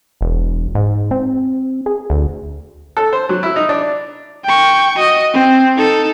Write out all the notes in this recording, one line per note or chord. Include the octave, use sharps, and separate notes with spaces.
E1
G#2
C4
G#4
D2
A4
C5
F#3
E4
D#4
D4
G5 C#6
F#4 D#5
C4
D#4 A4